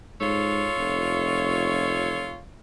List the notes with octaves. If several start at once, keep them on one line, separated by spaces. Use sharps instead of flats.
G#2 F4 A4 C#5
F1